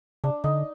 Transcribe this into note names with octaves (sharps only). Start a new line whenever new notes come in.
C#3 D4
D3 D#4